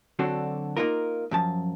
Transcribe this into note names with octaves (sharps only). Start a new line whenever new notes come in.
D3 F#3 C4 D4 F#4 A4
A#3 B3 D#4 F4 A#4
F#2 F3 A5